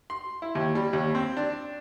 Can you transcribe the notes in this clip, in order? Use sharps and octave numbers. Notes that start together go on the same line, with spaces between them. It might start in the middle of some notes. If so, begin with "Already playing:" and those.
C6
E4
D#2
G3
D#2
C4
D4